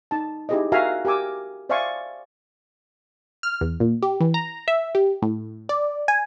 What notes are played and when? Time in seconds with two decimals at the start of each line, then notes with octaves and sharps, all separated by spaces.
0.11 D#4 A5
0.49 D#4 E4 G4 G#4 C5 D#5
0.72 F#4 A#4 E5 F5 G#5 A#5
1.05 G4 A#4 G#5 D6 E6
1.69 C5 D5 E5 F5 G#5 C#6
3.43 F6
3.61 E2
3.80 A#2
4.02 G4
4.20 E3
4.34 A#5
4.68 E5
4.95 G4
5.22 A2
5.69 D5
6.08 G#5